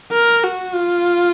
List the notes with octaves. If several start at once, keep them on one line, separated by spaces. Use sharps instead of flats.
A#4
F#4
F4